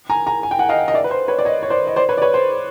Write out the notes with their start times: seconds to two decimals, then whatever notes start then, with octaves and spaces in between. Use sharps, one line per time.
0.10 G#5 A#5
0.26 G#5 A#5
0.43 G#5
0.51 G5
0.59 F#5 G#5
0.69 D#5 F5
0.88 D#5
0.94 D5 E5
1.04 B4
1.11 C5
1.28 B4 C#5
1.39 D5
1.45 C#5 D#5
1.63 C#5
1.70 C5 D5
1.87 D#5
1.96 C5 D5
2.09 B4 C#5
2.18 D5
2.22 B4 C#5
2.34 C5